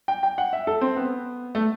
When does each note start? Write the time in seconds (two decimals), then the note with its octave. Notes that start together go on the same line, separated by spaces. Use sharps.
0.08 G5
0.23 G5
0.38 F#5
0.53 E5
0.67 A4
0.81 C4
0.97 B3
1.55 A3